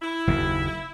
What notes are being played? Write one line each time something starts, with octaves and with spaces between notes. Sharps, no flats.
E4
F#1 D#2